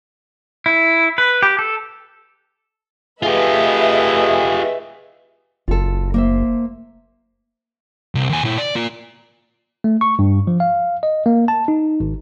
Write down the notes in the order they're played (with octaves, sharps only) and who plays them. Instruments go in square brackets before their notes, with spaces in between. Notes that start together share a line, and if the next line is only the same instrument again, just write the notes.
[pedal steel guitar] E4
B4
G4
A4
[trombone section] A3 G#4 [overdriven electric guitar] F4 G4 [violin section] B4 D#5 E5
[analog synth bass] F#1 [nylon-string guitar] F4 A4
[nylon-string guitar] A#3 C5 E5
[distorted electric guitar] C2
D#2 G#5
A#2 E4
D5
A#3 F4
[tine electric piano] A3
C#6
G2
F3
F5
D#5
A#3
A5
D#4
G#1